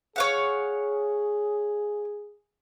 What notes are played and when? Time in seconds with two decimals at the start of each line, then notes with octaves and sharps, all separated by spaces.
0.16 G#4 C#5 F5 F#5